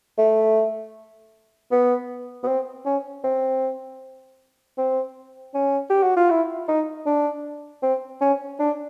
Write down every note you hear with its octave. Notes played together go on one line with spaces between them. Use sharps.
A3
B3
B3
C4
C#4
C4
C4
C#4
G4
F#4
F4
E4
D#4
D4
C4
C#4
D4